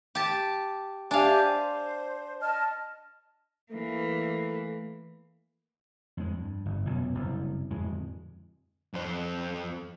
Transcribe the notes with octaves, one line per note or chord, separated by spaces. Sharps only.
G4 A5
D4 G4 E5 F5 G#5
C5
D#5 A5 F6
E3 A3 A#3
F2 G#3
G2
G1
F1 B1 F#2
F#1 C2
D1 F2 G#3
F2 C5